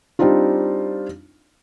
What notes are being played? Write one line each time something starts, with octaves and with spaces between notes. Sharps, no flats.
G3 C4 D4 D#4 F4